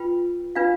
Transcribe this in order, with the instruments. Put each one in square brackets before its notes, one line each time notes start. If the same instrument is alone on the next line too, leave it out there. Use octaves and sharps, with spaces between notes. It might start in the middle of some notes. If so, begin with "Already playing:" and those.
Already playing: [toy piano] F4 B4 G5 B5
D4 F4 B4 F5